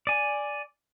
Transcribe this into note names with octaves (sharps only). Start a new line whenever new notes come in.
D5 G#5